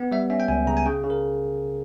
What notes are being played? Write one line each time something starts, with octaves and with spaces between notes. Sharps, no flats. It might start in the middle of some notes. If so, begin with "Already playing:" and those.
Already playing: B3
G3 E5
C#4 E5
G5
C#2 G#5
C#3 A#5
G#5
C#3 G5
C#3
A#4